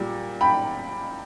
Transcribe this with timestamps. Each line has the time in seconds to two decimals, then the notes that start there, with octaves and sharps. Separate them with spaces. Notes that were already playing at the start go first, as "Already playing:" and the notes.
Already playing: A#2 G3
0.41 G5 B5